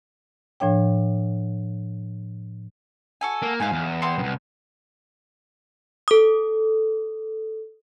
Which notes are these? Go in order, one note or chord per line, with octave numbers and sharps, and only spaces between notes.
A2 F3 D4 C#5 G5
F#4 A4 G#5
A#3
G#2 F5 G#5
E2
B3 C4 C6
C2 F#2
A4 D#6